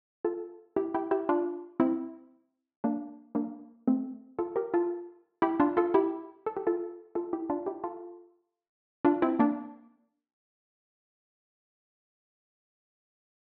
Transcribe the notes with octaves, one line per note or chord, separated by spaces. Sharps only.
F4 A4
E4 G4
E4 G4
E4 G4
D4 F4
C4 E4
A#3 D4
A#3 D4
A3 C4
F4 A4
G4 A#4
F4 A4
E4 G4
D4 F4
F4 A4
E4 G4
A4
G4
F4 A4
F4 A4
E4 G4
D4 F4
E4 G4
F4 A4
D4 F4
C4 E4
A#3 D4